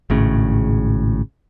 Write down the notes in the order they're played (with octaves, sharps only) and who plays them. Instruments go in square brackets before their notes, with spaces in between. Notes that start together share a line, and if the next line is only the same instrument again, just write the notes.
[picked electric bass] G#1 A2 C#3